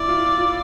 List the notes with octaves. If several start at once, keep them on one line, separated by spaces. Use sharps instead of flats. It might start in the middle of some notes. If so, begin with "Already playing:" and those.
Already playing: E4 D5
F4
F4